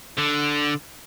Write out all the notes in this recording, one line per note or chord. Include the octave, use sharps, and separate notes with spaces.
D3